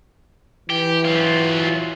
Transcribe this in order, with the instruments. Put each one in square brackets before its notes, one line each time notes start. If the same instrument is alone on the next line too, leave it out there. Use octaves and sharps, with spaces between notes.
[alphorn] E3 [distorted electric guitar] G4
[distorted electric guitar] F#3 F4